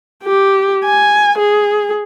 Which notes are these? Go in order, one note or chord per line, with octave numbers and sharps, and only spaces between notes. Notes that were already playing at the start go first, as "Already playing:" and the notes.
G4
G#5
G#4